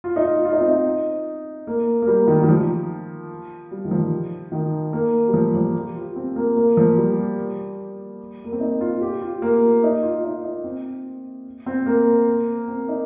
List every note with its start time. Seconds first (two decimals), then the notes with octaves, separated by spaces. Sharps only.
0.04 F4
0.16 D#4
0.24 F4
0.45 F4
0.52 D#4
0.60 C4
0.67 D#4
1.67 A#3
2.02 A#3
2.07 G3
2.27 D#3
2.43 D#3
2.49 F3
3.71 G3
3.85 D#3
3.91 F3
4.52 D#3
4.93 A#3
5.28 G3
5.34 F3
5.54 F3
5.74 G4
5.95 F4
6.16 C4
6.36 A#3
6.57 A#3
6.77 F3
6.97 G3
8.44 A#3
8.52 C4
8.60 D#4
8.81 F4
9.01 G4
9.22 F4
9.42 A#3
9.83 D#4
10.03 F4
10.24 D#4
10.44 D#4
10.64 C4
11.66 C4
11.86 A#3
12.68 C4
12.88 D#4